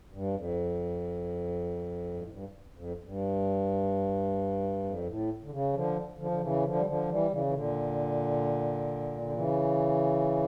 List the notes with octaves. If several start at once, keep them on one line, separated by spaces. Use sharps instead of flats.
G2
F2
G2
A2
G2
F2
F2
G2
F2
A2
D3
C#3
D3 F3
D3 F3
D3
C#3 E3
D3 F3
G3
D3 F3
E3 G3
C#3 E3
E3
A#2 D3
D3
C#3 E3